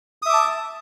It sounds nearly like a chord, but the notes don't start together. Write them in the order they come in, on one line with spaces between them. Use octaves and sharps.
D#6 E5 D6 A5